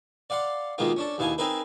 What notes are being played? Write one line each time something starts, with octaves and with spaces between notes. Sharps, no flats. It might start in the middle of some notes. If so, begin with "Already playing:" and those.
D5 F5 F#5 C6
B2 D#3 G#3 A#3 F4
C#4 D4 A4
D#2 B2 E4 F5 G#5
C4 D#4 G#4 A#4 B4 E5